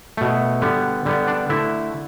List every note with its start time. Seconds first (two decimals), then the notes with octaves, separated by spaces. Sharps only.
0.17 B2 A3
0.62 D3 G3 B3
1.06 D3 G3 B3
1.27 D4 D5
1.49 D3 A3 E4 E5